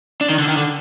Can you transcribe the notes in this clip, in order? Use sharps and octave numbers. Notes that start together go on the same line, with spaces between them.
D4
D#3
D3
D#3
D3